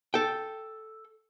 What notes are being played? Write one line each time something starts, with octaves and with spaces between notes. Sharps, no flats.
A4 G5